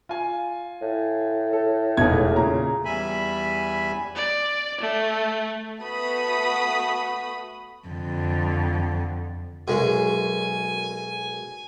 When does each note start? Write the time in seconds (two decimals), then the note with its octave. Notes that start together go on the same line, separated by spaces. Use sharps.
0.09 F4 G#5
0.82 A2
1.53 A4
1.97 E1 B2 A3 D#4 A#4 G#6
2.36 A#2 C#3 A#5
2.85 E2 G3 E5 G#5 B5
4.16 D5
4.81 A3
5.81 A3 B3 F#4 B5 D#6
7.88 F2 D3
9.68 B1 F#2 G#3 G#5